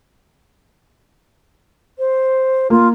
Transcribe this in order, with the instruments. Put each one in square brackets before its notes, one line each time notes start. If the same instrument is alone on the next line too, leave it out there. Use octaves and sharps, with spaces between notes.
[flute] C5
[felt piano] A#3 [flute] F4